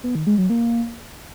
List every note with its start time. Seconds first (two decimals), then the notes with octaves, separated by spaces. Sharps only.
0.04 B3
0.15 D#3
0.27 G#3
0.38 F#3
0.50 A#3